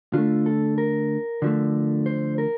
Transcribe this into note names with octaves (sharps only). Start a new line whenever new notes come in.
D3 A3 F4
A4
A#4
D3 F3 A3
C5
A#4